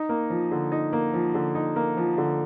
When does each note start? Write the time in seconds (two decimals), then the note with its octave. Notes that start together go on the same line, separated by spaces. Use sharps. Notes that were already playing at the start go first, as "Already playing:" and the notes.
Already playing: D#4
0.09 A#3
0.30 F3
0.51 D3
0.72 D#4
0.93 A#3
1.13 F3
1.34 D3
1.55 D#4
1.76 A#3
1.97 F3
2.18 D3